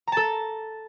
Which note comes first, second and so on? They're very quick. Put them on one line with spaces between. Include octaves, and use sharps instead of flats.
A#5 A5 A4